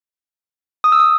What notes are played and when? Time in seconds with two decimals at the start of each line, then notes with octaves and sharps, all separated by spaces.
0.84 D#6
0.92 E6
1.00 D#6